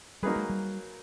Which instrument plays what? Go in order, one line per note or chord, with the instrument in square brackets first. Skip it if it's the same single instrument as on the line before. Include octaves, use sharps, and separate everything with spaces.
[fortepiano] F#3 A#3 D#4 G#4 B4 [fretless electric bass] G3
[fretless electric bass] G#3
G3